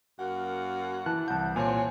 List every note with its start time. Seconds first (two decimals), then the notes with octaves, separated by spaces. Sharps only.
0.19 F#2 A#3 F#5
1.06 E3 A5 F#6
1.28 C2 F#5 A5 G6
1.56 A#2 C4 C#5 G#5 A5